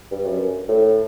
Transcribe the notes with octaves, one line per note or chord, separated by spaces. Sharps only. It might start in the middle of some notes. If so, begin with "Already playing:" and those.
G2
F#2
A2